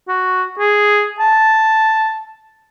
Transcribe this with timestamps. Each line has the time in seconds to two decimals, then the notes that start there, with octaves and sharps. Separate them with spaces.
0.08 F#4
0.59 G#4
1.20 A5